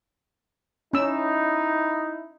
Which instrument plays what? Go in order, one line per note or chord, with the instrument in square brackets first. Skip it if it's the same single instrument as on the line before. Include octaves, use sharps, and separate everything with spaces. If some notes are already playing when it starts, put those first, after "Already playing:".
[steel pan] C#4 E6 [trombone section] D#4 E4